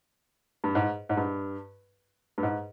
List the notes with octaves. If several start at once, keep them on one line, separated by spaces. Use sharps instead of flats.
G2
G#2
G#2
G2
G2
G#2